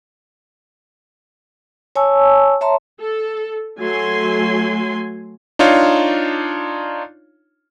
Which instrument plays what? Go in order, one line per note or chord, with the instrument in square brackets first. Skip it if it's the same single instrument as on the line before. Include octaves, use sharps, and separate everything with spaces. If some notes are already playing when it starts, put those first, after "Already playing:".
[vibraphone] C#5 G#5 A5 C#6 E6
C#5 E5 A5 A#5 C6
[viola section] A4
F#3 A3 G#5 C6
[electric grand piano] D4 D#4 F4 C#5 F5